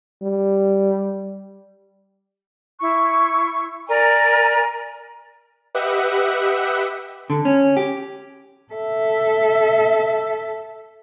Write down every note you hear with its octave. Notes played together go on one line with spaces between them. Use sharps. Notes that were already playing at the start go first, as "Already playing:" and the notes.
G3
E4 C#6
A#4 D5 G#5 A#5
G4 B4 D#5 E5 F#5
D3
C#4
G4
A4 E5